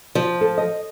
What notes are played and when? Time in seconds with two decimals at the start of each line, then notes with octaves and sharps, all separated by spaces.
0.15 F3
0.41 A4
0.58 D#5